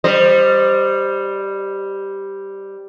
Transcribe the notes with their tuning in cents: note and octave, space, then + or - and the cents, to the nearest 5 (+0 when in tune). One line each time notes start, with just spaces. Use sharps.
G3 +0 C5 +0 D#5 -25